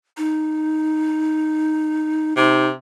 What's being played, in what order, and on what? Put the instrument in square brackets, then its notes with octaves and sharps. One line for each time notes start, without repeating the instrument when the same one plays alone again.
[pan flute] D#4
[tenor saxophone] C3 [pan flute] D#4